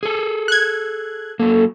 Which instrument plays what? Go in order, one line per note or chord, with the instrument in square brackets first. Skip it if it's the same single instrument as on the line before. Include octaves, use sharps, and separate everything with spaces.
[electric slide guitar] G#4 A4
[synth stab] F#6 G#6
[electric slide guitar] F#3 A#3 [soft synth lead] A4